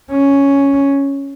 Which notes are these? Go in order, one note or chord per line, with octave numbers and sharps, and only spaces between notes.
C#4